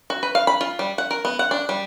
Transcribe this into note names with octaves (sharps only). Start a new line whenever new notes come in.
F#4
B4
F5
B5
F4
G3
F#5
A#4
B3
F#5
D4
G3